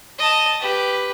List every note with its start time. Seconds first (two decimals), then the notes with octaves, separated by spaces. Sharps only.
0.18 D#5 A5
0.60 G4 B4